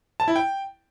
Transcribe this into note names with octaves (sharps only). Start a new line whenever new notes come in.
A5
E4
G5